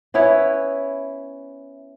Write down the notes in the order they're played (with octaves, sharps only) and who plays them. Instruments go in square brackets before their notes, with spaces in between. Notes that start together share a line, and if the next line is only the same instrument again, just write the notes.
[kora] B3 C#4 E4 C#5